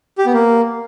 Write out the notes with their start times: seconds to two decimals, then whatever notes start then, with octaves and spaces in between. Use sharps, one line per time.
0.18 G4
0.26 B3
0.33 A#3